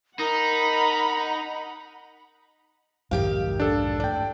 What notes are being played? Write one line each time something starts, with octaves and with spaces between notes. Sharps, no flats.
D#4 A#4 F#5 A#5 B5
B1 F2 G#2 D#3 G4 F5
D4 A4
A2 D5 G5